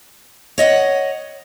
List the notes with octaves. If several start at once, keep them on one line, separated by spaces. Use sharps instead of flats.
C#5 D#5 E5 F#5